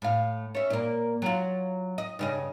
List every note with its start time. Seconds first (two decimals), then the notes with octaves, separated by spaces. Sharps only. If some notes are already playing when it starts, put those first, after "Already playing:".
0.02 A2 F5
0.55 C#4 E5
0.70 A#2 A#3
1.22 F#3 F4
1.98 D#5
2.19 G2 C#3 D#5